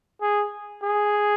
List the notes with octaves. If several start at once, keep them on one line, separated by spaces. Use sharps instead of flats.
G#4
G#4